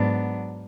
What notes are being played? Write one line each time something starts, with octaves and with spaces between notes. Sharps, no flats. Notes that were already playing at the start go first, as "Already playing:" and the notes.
Already playing: G#2 F#3 B3 D4